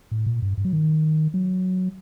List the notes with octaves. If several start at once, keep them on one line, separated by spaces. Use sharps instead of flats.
A2
A#2
G2
G2
F#3
D#3
F#3